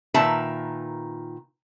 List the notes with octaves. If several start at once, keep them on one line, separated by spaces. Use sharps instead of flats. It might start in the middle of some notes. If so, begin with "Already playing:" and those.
A#2 D#3 B4 E5 A5 A#5